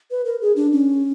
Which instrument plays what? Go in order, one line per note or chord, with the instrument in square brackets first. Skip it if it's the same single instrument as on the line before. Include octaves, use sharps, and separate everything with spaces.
[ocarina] B4
A#4
G#4
D4
C#4